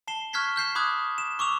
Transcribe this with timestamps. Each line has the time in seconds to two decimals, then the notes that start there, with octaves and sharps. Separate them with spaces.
0.08 A5 C7 E7 G7
0.33 C#6 F6 F#6 G#6 B6 C7
0.56 F6 G6 C7 E7
0.75 B5 D6 D#6 F#6 G#6
1.18 E7
1.39 C#6 D6 E6 F7